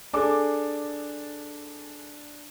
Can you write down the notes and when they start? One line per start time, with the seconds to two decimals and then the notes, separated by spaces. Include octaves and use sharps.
0.13 D4 G#4 A4 D6